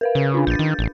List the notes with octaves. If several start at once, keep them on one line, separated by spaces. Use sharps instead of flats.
A#4 B4 F5
C#3
D4 F4
A#1 G6 A6
D#3
A1